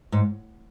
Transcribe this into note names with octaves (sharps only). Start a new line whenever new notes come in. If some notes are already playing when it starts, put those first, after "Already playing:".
G#2